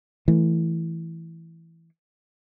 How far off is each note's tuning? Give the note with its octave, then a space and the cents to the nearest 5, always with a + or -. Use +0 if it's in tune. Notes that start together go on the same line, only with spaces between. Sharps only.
E3 +0 A3 +0